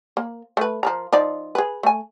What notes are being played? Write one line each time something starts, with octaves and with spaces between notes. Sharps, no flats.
A#3
A3 B4
F3 A#4 A#5
F3 D#4 D5
G#4 B4
A3 G#5